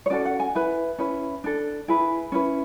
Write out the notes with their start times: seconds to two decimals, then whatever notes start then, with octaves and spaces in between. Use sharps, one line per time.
0.06 C#5
0.10 C#4 F#4 A4 D5
0.25 F#5
0.40 G#5
0.55 E4 B4
0.98 C#4 E4 B4
1.44 D4 A4
1.88 E4 G#4 B4
2.32 C#4 E4 B4